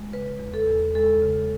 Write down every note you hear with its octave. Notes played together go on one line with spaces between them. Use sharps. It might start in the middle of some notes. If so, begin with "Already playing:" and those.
Already playing: G#3
C#3 B4
E2
A4
E2
G#3 A4
C#3